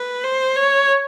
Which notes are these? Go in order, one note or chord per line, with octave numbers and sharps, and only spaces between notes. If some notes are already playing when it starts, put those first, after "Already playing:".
Already playing: B4
C5
C#5